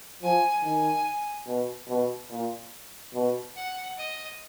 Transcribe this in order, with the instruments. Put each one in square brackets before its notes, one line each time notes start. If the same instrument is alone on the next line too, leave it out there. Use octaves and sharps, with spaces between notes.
[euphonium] F3 [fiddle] G#5
[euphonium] D#3 [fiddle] G#5
[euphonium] B2
B2
A#2
B2
[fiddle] F#5
D#5